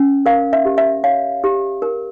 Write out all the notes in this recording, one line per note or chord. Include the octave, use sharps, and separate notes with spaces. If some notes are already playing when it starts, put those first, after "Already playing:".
Already playing: C#4
A#4 F5
E5
G4
E5
C#5 F5
G4
A#4